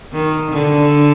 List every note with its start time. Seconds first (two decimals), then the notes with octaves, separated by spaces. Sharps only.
0.13 D#3
0.51 D3